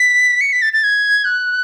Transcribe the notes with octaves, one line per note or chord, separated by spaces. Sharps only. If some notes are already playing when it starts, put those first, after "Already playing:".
Already playing: B6
C#7
B6
A6
A6
G#6
F#6